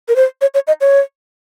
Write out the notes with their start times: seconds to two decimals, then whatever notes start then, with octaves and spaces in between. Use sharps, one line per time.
0.08 A#4
0.16 C5
0.41 C#5
0.54 C#5
0.67 D#5
0.81 C#5